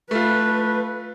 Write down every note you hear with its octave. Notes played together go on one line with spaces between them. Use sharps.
A3 F4 B4